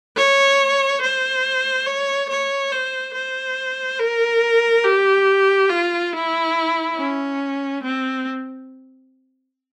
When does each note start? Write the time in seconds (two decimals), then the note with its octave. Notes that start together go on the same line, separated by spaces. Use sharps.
0.17 C#5
1.01 C5
1.86 C#5
2.30 C#5
2.72 C5
3.14 C5
3.99 A#4
4.84 G4
5.69 F4
6.13 E4
6.97 C#4
7.84 C4